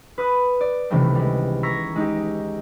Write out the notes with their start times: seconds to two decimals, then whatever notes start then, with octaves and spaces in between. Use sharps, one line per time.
0.18 B4 D#6 F#6
0.61 D5
0.90 C#2 C3 D#3 E3 G3 A3
1.15 G3 G#3
1.63 A#5 C#6 E6 G#6 A#6 B6
1.96 G#3 D#4 G4